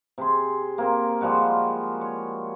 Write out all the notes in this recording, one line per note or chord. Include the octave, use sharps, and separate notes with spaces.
C3 G#4 C6
A#3 C4 A#4
F3 G3 G#3 F#4
C#5